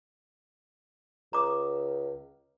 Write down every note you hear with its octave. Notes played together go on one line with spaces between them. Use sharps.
C#2 A#5 D6 D#6